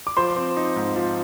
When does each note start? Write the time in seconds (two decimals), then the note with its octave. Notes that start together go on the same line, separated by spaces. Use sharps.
0.07 D6
0.17 F3 C5 C6
0.36 C4
0.57 D#4
0.76 G#2
0.96 F3